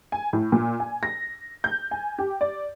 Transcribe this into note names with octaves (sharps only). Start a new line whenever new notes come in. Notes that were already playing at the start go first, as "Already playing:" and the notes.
G#5
A2
A#2
G#5
A#6
G6
G#5
G4
D5